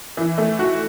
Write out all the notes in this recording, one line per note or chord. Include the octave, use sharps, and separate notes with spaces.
E3
A3
F#4